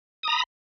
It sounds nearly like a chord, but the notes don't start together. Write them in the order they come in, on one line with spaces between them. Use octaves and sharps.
D#6 A#5 B5